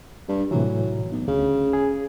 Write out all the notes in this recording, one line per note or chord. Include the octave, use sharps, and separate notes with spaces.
G2
A2 C3 E3 F#3
B1
D2 C#3
G#4